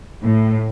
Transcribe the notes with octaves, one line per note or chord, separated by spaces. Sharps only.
A2